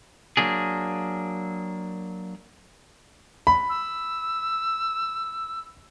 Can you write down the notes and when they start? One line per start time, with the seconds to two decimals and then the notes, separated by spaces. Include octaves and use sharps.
0.37 F#3 A#3 D4 G#4
3.47 B5
3.69 E6